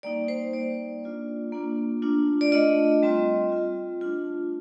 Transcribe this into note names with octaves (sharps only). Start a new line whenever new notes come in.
G3 A#3 D#4 D5
C5
G3 A#3 D#4 D5
A#3 D4 F4
A#3 D4 F4
A3 D4 F4
D5
A3 D4 F4 D#5
G3 C4 F4
G3 C4 F4
A3 D4 F4